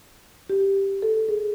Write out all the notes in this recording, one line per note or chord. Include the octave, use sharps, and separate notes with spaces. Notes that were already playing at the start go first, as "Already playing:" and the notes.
G4
A4
G#4